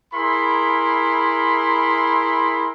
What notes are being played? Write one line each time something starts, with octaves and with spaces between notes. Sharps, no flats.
E4 G#4 A#4 B5 C6